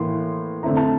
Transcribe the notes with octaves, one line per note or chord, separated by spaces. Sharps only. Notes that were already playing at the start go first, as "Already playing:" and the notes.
Already playing: A2 E3 A#3 C6
D3 A3 C4 E4 A#5
A5